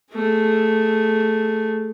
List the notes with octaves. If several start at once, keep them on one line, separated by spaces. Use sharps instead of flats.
A3 G#4